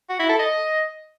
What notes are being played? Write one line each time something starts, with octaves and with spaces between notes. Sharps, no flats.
F#4
E4
A4
D#5